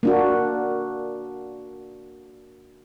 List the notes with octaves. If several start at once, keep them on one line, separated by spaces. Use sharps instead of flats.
A#3 D4 F#4